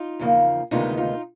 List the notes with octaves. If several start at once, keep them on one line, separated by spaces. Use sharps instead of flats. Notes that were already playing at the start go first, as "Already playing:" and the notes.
Already playing: D#4 F4
E2 C#3 F3 A#3
D2 C3 D#3 G#3 B3 D#4 F4
D#4 F4